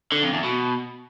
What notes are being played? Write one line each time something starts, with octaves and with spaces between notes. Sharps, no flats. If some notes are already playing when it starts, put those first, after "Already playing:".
D3
F2
E2
B2